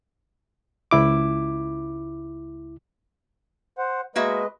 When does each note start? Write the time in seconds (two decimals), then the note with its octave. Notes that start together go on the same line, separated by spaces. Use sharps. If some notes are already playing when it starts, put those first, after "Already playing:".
0.91 C#2 E4 D6
3.78 C5 F#5
4.16 G#3 A#3 F#4 B4 D#5 E5